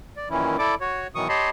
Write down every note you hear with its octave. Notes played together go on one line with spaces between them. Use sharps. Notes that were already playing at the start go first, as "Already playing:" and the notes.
D5
F#2 A#2 D#3 E3 C#4 E4
E4 A4 D5 D6
F#4 C#5
B2 D#3 E3 F#3 C#6 D#6
G4 C#5 D#5 A5 B5 C6